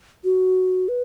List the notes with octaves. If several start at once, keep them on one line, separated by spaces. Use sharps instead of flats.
F#4
B4